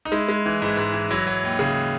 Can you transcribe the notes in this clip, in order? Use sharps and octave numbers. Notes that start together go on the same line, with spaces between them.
D#4
G#3 E4
G#3
E3
G#2 E4
G#2
E3
F#3 E4
F#3
D#2
C#3 G#4